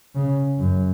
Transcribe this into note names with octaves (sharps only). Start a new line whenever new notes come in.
C#3
F#2